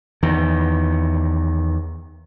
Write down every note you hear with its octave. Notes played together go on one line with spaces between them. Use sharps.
E2 D#3